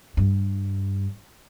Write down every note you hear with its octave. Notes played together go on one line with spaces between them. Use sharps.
G2